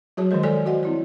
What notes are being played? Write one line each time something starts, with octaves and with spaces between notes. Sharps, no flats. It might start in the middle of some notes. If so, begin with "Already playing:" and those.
F#3 F#4 G#4 C#5 A5
D#3 F3 G#3 A#4 D#5
A4 C#5 D5 G#5
F#4 C5 D#5 F#5
C4 E4 C#5